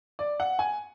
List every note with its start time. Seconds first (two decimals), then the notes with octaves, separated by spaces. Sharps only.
0.19 D5
0.40 F#5
0.59 G#5